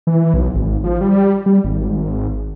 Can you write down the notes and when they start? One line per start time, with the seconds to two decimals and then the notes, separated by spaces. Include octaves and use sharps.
0.07 E3
0.34 B1
0.55 G#1
0.84 F3
1.01 G3
1.46 G3
1.64 G#1